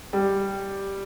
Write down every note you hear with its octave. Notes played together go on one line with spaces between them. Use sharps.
G3